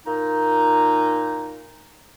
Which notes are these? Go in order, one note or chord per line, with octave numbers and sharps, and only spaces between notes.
A#2 D#4